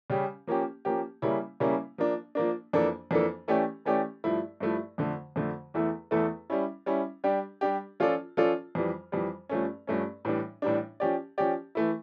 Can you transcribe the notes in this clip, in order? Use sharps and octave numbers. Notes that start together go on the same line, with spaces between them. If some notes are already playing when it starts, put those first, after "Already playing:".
C#3 G3 C#4 G4
F3 A#3 C#4 G4
F3 A#3 C#4 G4
C#3 G3 A#3 C#4 E4
C#3 G3 A#3 C#4 E4
F3 A#3 D4
F3 A#3 D4
F2 E3 A#3 D4 A4
F2 E3 A#3 D4 A4
E3 A3 C#4 G4 D5
E3 A3 C#4 G4 D5
G2 F3 A3 E4
G2 F3 A3 E4
F2 D3 A3
F2 D3 A3
E2 E3 A3 E4 A4
E2 E3 A3 E4 A4
G3 C#4 E4
G3 C#4 E4
G3 D4 G4
G3 D4 G4
F3 C#4 F4 A4 D5
F3 C#4 F4 A4 D5
F2 E3 G3
F2 E3 G3
G2 F3 A3 C#4
G2 F3 A3 C#4
A2 E3 G3 D4
A2 E3 G3 D4
F3 C#4 G4 D5
F3 C#4 G4 D5
E3 A3 E4